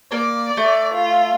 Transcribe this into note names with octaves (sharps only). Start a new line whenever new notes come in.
A#3 D5
A3
F4